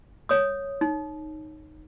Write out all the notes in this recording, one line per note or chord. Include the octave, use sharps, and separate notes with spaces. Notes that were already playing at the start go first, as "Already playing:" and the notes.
C#5 D#6
D#4